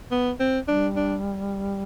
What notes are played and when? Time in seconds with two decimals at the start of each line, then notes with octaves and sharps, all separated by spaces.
0.11 B3
0.40 C4
0.68 G3 D4
0.96 D4